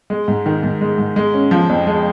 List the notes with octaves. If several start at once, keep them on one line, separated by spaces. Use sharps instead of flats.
G#3
G#2
D#3
G#2
G#3
G#2
G#3
C#4
F3
F2
G#3